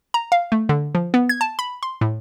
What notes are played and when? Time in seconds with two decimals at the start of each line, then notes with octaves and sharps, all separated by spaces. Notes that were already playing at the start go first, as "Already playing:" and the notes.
0.14 A#5
0.32 F5
0.52 A3
0.69 D3
0.95 F3
1.14 B3
1.29 G#6
1.41 A5
1.59 B5
1.83 C6
2.01 A2